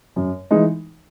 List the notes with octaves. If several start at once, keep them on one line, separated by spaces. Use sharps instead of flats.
F#2
E3 G#3 D#4